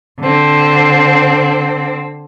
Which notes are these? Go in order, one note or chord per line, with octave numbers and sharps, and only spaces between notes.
D3 C4